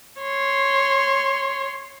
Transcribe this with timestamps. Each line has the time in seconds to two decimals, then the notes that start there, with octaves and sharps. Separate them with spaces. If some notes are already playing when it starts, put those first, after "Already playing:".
0.21 C#5 C6